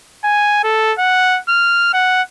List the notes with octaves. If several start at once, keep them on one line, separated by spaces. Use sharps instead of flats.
G#5
A4
F#5
F6
F#5